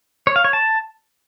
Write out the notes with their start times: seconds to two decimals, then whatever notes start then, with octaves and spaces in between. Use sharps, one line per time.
0.27 C#5
0.36 F5
0.44 C#5
0.53 A5